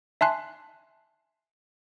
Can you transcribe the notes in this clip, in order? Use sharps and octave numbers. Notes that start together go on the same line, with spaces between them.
E5 G#5 A5 C6 F#6 C7